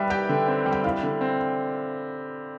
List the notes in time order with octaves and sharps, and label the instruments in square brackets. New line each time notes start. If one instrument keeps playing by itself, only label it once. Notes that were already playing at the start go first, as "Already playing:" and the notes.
Already playing: [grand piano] G3 [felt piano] B4 E5
[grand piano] G4 [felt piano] G5
[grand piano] D3
C4
G3
[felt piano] G5
[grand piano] E4 [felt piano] F5
[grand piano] D3
C4